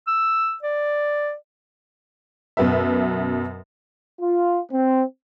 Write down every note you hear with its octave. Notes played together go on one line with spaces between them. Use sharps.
E6
D5
F#2 B2 B4 E5
F4
C4